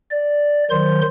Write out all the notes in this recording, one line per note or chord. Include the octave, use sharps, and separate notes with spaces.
D5
D#3 F#3 C5 C6